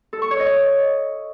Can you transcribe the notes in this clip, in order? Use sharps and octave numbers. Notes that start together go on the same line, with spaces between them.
A4
C#6
C#5
D#5